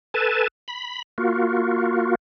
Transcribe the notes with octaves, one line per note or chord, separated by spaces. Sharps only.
A4 B4 G#5 A5
B5
A#3 F4 F#4